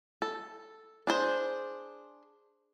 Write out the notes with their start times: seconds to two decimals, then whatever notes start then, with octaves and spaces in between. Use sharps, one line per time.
0.22 A4
1.07 D4 G#4 C5